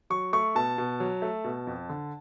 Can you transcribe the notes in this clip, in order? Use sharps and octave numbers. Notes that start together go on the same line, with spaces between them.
F#3 C#6
A3 C#6
B2 A5
B2
F#3
A3
B2
F2
D3